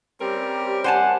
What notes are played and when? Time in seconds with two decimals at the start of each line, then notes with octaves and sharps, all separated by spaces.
0.21 G3 C4 C#4 G4 A#4
0.84 C5 F#5 G#5 A5